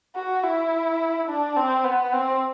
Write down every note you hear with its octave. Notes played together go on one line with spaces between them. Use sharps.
F#4
E4
D4
C4
B3
C4